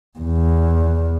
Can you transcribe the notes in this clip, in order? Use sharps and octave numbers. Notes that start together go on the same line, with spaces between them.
E2